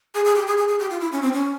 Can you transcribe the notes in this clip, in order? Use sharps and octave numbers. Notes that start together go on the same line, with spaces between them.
G#4
G#4
G4
G#4
G#4
G#4
G4
F4
E4
C#4
C4
C#4